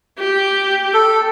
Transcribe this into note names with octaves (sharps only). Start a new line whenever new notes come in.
G4
A4